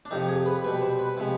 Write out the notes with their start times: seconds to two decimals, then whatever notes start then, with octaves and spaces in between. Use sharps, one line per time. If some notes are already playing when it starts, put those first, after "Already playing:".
0.05 D4
0.11 F2 C3 F3 D#4
0.28 G#4
0.46 B4
0.64 B2 G3 B4
0.82 C5
0.99 B4
1.17 C3 F3 G#3